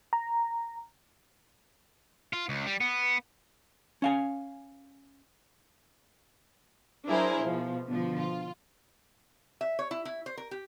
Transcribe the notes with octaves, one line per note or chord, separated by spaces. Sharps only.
A#5
F4
C#2
G3
B3
C#4 F5 G#5
F#3 D4 E4 G#4 A#4 C5
B2 F3
B2 D3 F3
F4
E5
C#5
E4
E4
C5
A#4
G4